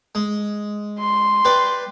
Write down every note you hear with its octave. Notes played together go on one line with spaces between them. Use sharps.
G#3
C6
G4 B4 D5